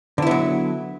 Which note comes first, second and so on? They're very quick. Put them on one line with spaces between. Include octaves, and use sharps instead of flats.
D3 E4 B3 F#3